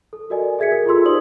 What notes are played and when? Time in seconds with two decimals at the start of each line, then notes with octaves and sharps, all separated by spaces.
0.13 A4
0.30 F#4 A#4 D5 D#5 G#5
0.59 G#4 E5 G#6 B6 C#7
0.71 A4 A#4
0.86 F4 G4 G#4 C6 E6
1.04 D#4 C5 D5 D#6 F#7